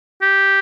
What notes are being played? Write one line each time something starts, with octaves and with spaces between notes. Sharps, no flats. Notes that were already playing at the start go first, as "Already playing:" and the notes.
G4